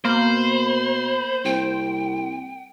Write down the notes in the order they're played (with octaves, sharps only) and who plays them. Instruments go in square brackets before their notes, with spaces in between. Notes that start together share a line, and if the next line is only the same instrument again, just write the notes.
[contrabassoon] B2 [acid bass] A#3 [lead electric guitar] C5 [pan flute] B5
[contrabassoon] C2 [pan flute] G5